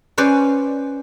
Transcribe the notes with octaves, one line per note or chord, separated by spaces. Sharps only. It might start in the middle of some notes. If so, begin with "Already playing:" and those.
C#4 B4 C5 D5